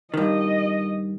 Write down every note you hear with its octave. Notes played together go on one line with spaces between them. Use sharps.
G2 D#3 D#5